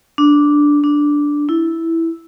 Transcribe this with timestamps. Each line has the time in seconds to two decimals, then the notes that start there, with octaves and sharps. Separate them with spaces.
0.18 D4
0.84 D4
1.49 E4